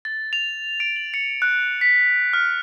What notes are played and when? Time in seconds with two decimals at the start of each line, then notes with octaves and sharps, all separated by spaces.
0.05 A6
0.33 F7
0.80 D7
0.96 F#7
1.14 C#7
1.42 F#6
1.81 B6
2.33 F6